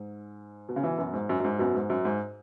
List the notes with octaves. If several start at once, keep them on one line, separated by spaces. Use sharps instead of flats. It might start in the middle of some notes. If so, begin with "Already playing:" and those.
Already playing: G#2
B2
C#3
B2 E3
F#2 B2
G#2
F#2
F#2
G#2
F#2 B2
G#2
F#2
G#2